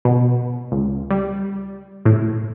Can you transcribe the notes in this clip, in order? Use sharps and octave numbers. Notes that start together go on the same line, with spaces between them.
B2
C#2
G3
A2